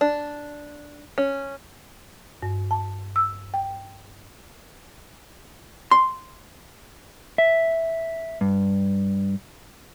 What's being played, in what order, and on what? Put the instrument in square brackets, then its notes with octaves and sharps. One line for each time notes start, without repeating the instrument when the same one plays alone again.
[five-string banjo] D4
C#4
[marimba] G2
A5
E6
G5
[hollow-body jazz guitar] C6
[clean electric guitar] E5
G2